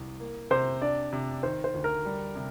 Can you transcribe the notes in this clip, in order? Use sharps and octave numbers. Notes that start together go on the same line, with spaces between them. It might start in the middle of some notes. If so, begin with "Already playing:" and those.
Already playing: C2
A#3
C3 C5
D4 D5
C3
D#3 C5
C5
D2
A#4
G3
C3